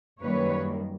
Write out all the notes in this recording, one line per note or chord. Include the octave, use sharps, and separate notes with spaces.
F#2 D#3 G3 A#3 B4 C#5